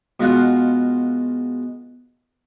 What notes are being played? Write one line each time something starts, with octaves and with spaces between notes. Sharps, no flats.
B2 G#3 F4 F#5